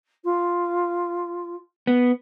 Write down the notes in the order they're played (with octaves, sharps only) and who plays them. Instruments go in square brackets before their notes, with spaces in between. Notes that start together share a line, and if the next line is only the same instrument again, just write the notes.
[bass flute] F4
[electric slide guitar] B3